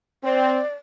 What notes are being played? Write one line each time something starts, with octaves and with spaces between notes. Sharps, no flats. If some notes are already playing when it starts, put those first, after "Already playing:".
C4 D5